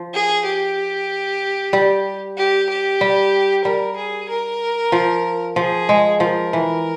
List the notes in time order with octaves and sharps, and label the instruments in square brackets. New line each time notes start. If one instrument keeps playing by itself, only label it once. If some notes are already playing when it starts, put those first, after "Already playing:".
Already playing: [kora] F3
[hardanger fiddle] G#4
G4
[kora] G3
[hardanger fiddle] G4
G4
[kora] G3
[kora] G3 [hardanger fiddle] A#4
[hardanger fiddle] G#4
A#4
[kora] F3
[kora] F3 [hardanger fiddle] G#4
[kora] G#3
[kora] F3 [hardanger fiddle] A#4
[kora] E3